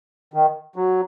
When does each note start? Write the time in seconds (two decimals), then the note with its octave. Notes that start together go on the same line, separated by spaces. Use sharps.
0.34 D#3
0.76 F#3